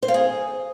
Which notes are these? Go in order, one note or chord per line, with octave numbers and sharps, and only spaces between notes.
C5
F5
G#4